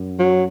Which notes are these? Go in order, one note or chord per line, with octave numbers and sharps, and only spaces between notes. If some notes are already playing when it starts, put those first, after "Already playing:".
Already playing: F#2
F#3